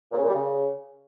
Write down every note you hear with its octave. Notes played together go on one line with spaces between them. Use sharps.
A#2
C#3
A#2
G3
C#3